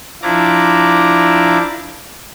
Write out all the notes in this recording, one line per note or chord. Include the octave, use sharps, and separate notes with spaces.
F3 D4 E4 A#5 D6